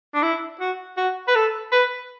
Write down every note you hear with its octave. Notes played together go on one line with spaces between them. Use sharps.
D4
E4
F#4
F#4
B4
A4
B4